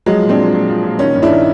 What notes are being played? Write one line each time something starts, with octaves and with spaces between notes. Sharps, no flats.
F3 F#3 G#3
A#2
C4 D4
F3
A#2
F3
A#2
D#3 C#4 D#4
G2
D4 E4
D#3